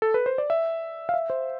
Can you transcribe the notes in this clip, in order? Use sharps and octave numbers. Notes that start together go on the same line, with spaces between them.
A4
B4
C5
D5
E5
F5
E5
C5